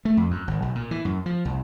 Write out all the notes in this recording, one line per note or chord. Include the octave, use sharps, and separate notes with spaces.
A3
F2
F#2
G#1
B1
A#2
E3
F#2
F3
C2